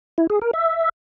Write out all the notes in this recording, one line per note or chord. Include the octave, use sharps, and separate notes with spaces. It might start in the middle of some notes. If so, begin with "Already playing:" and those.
E4
G#4
A#4
E5